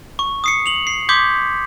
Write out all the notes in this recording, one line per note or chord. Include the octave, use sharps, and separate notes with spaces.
C#6
D#6 C7 C#7
F7 F#7
C7
C6 D6 D#6 G6 G#6 B6